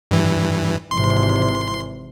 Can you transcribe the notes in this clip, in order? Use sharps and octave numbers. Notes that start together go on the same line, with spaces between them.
G2 E3
G#1 C3 E3 C6